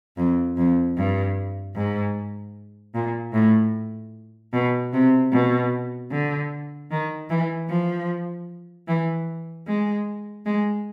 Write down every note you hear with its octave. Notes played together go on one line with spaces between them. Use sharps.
F2
F2
G2
G#2
A#2
A2
B2
C3
B2
D3
D#3
E3
F3
E3
G#3
G#3